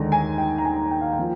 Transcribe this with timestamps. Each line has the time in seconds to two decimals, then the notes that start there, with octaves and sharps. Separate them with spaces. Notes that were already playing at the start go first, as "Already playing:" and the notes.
Already playing: D#2 D3 G#3 A#5
0.12 G#5
0.38 G5
0.58 A#5
0.65 G#5
0.91 G5
1.01 F5
1.12 G5
1.18 F3 A#3